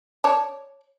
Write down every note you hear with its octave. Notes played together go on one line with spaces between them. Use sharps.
C#5 D5 A5